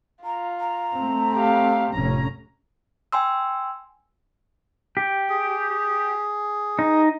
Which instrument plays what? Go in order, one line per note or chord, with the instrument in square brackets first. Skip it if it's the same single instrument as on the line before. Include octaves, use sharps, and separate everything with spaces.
[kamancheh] F4 [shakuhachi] A#5
[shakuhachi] A#5
[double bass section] A3 C4
[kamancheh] G4 F5
[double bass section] F1 A2 C#4 [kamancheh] A#5
[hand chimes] G5 G#5 C6 E6
[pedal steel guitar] G4
[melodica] G#4
[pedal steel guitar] D#4